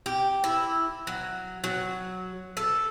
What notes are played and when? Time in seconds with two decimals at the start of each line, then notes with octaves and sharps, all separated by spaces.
0.06 G4
0.44 E4
1.07 F#3
1.64 F#3
2.57 A4